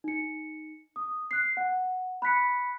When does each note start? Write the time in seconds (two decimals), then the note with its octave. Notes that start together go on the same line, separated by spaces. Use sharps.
0.04 D#4 C#7
0.96 D#6
1.31 F#6 C7
1.57 F#5
2.22 B5 F#6 B6 C#7